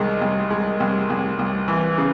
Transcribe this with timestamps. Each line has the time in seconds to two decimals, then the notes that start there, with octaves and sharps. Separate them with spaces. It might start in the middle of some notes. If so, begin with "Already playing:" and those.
Already playing: C2 D#3 G#3
0.21 C2
0.50 G#3
0.80 C2
1.10 C2
1.39 C2
1.68 E3
1.98 C#3